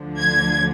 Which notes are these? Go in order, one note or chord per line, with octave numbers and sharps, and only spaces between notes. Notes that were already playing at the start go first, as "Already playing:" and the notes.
Already playing: D2 D3 F3
G#6